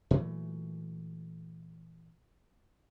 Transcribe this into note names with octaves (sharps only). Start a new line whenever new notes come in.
A#2 E3 F#3 A3